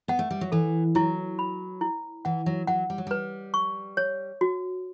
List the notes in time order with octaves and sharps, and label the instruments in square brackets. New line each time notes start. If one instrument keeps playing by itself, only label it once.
[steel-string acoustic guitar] B3 [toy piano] F#5
[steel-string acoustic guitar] A3
G3
F#3
[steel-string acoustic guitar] E3 [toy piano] A4
[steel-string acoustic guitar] F#3 [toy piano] E4
[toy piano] B5
E4
[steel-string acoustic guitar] E3 [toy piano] F#5
[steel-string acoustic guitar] F#3
[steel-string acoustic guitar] F#3 [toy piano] F#5
[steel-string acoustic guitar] G3
F#3
[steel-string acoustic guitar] G3 [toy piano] B4
[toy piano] C#6
C#5
F#4